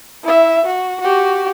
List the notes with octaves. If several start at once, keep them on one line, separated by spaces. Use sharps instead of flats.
E4 E5
F#4
F#4 G4